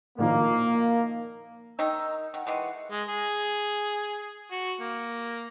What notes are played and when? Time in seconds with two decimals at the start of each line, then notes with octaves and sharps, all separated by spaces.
0.18 A#2 D#3 F3 A#3
1.79 D#3 D#4 A#5 E6
2.34 D#3 F#5
2.47 D#3 E3 G#3
2.91 G#3
3.09 G#4
4.52 F#4
4.81 A#3